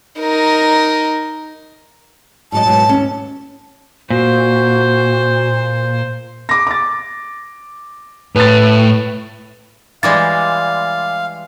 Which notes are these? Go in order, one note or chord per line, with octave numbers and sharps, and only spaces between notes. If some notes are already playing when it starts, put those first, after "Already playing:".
D#4 A#4
G#2 F#3 D#5 A5
G#2 B2 F#3
D#2 G#2 C#4
A#2 F#4 C5
D6 A#6
D6 A6
A2 B4 A6
E3 G3 G#3 D5 F5 D6 A6